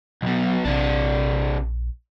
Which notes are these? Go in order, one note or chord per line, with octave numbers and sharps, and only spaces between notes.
B1 B2 F#3
A#1 C3 D4